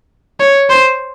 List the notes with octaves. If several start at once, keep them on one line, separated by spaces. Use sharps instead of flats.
C#5
C5